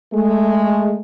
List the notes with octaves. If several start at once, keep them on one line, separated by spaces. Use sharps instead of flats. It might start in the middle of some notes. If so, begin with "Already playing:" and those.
G#3 A3